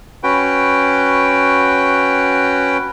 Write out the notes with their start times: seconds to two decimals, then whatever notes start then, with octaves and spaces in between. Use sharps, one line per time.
0.23 C#4 F#4 B4 G5